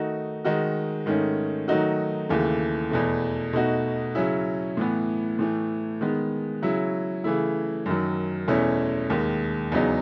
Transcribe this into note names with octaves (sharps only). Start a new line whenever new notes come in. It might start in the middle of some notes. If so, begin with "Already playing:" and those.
Already playing: D#3 A3 D#4 F#4
D#3 G#3 D#4 F#4
G#2 D#3 A3 C#4
D#3 F#3 A3 D#4 F#4
D#2 C#3 E3 A3
E2 B2 A3
B2 A3 D#4 F#4
C#3 F#3 C#4 E4
A2 E3 B3
A2 E3 A3
D#3 G#3 B3
C#3 F#3 C#4 E4
C#3 E3 A3 E4
F#2 D#3 F#3
E2 B2 A3 C#4 E4
D#2 D#3 G#3
E2 C#3 F#3 B3 D#4